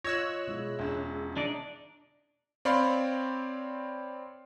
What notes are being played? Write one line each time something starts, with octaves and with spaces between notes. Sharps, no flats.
F4 C#5 D#5 E6 F#6 G#6 A#6
B2 G#3 E4
E1 C#4 E5
D4 D#4 D5
C4 C#5 D5 F5 B5 C6